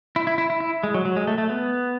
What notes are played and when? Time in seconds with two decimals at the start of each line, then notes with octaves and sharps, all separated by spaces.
0.16 E4
0.27 E4
0.38 E4
0.50 E4
0.60 E4
0.83 G#3
0.94 F#3
1.05 F#3
1.16 G#3
1.27 A3
1.38 A3
1.49 B3